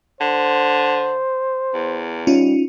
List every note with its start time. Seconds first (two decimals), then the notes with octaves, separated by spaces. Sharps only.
0.21 D3 C5
1.74 E2
2.27 G3 C#4 D#4 F4